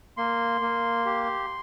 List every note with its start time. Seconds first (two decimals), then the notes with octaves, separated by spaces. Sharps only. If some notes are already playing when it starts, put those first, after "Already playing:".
0.17 A#3 C6
0.61 A#3
1.05 G4